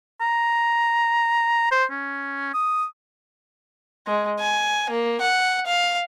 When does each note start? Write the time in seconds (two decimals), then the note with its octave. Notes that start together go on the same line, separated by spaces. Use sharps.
0.21 A#5
1.72 C5
1.91 C#4
2.54 D#6
4.07 G#3
4.40 G#5
4.90 A#3
5.21 F#5
5.67 F5